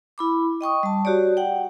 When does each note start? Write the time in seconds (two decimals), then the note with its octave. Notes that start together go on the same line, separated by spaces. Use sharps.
0.18 E4 B5 D6
0.61 D#5 G5 C#6 D#6
0.83 G3 A5
1.05 F#4 G4 C#5 D5
1.37 F#5 G5